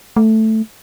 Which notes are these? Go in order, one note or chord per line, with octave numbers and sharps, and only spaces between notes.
A3